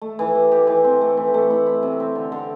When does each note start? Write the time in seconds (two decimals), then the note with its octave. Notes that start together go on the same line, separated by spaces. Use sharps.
0.02 A3
0.19 E3
0.35 G4
0.52 G4
0.67 E3
0.84 C4
1.01 A3
1.17 E3
1.34 A3
1.50 E4
1.67 E4
1.83 C3
2.00 C4
2.15 D3
2.32 D3